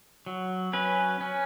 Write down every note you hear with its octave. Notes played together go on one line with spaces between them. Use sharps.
F#3
C#4 B4
C#4